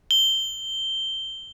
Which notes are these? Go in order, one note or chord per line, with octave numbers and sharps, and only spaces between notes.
G7